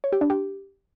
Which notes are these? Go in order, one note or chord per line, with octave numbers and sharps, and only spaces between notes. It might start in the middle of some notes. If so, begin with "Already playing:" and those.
C#5
G4
D4
G4